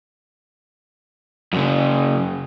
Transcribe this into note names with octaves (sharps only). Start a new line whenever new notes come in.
F#2 C#3